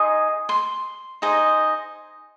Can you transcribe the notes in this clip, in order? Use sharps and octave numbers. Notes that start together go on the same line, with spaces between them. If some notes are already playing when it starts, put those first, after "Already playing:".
Already playing: D#4 G#4 D#5 C6
C6
D#4 G#4 C5 D#5